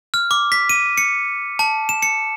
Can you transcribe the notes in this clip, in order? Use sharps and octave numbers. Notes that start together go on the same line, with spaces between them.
F6
D6
B6
D#7
C#7
A5
E7
C#7